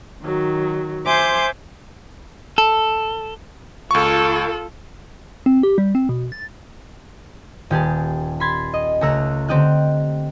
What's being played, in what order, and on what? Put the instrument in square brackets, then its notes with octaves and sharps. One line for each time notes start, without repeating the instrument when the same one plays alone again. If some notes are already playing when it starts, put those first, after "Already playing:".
[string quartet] D#3 F#3
C5 E5 G#5 C6 D6 G6
[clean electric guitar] A4
[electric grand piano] C#2 C#6 [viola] F4 A4
[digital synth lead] C4
G4
G3
C4
B2
A6
[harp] D#1 G4 G#4 A5
B5 C6 G#6 A6 B6
D#5
C#2 A3 A#5 E6 F#6
D3 C4 D4 G4 D#5 F#6